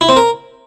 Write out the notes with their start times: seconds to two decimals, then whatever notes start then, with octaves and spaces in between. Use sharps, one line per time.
0.01 E4
0.09 C4
0.16 A#4